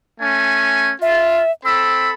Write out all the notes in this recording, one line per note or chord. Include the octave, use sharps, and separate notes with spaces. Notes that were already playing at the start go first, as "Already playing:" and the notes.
A3 C#4 G#5
F4 E5
C4 A4 B5 E6